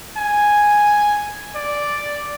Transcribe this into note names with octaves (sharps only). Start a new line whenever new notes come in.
G#5
D5